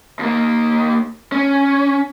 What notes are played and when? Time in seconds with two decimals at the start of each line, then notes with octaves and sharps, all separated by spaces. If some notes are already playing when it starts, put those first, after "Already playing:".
0.19 D#2 A#3
1.32 C#4